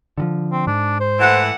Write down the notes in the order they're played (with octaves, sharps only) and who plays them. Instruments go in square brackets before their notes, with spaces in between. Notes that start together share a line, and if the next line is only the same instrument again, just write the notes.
[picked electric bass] D3 D#3 F3
[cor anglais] C4
[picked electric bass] G#2 [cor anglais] D4
[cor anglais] C5
[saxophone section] A2 E3 F#5